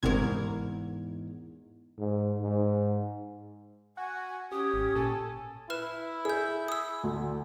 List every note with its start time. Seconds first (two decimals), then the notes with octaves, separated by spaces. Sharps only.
0.03 G1 E2 G#2 C3 A#4 G#6
1.98 G#2
2.41 G#2
3.97 F#4 G#5
4.52 C#4 G4 D#6
4.74 G#1
4.95 A#2 A4 G#5
5.70 E4 B4 F6 E7
6.25 G#4 E6 G6
6.68 D#6 E6
7.03 D2